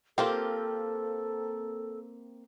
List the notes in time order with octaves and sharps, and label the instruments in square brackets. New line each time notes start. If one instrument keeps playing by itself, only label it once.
[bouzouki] A#3 C4 [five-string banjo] F4 G4 [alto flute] A4